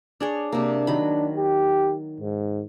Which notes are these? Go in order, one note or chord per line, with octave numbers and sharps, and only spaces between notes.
D4 G#4 C#5
C3 A#3 D4
D#3 F#3 B5
G4
G#2